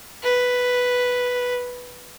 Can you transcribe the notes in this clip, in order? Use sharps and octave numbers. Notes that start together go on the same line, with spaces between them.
B4